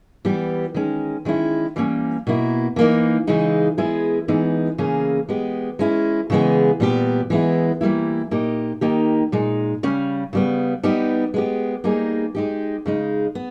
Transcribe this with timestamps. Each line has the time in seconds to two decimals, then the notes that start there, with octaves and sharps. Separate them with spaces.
0.25 E3 G3 B3 G4
0.74 D#3 G#3 C#4
1.25 D#3 G#3 C#4 E4
1.76 E3 G3 A#3 C#4
2.27 B2 A#3 E4
2.76 E3 A#3 D#4
3.27 C#3 E3 G#3 D#4
3.78 G#3 B3 E4 G#4
4.28 E3 G#3 B3 D#4
4.78 C#3 E3 A#3 C#4 G#4
5.29 G#3 B3 G4
5.79 G#3 C#4 E4
6.30 C#3 E3 G#3 B3
6.80 A#2 G3 B3 G4
7.30 E3 G#3 B3 E4
7.81 E3 G3 A#3 E4
8.31 A#2 A#3 D#4 G4
8.81 D#3 A#3 D#4 G4
9.32 A#2 G#3 D#4
9.83 C#3 G3 C#4
10.33 C#3 G3 B3
10.83 G3 B3 D#4 G4
11.34 G#3 B3 G4
11.84 G3 A#3 D#4 G#4
12.35 G#3 D#4 G4
12.86 C#3 G#3 D#4
13.35 B3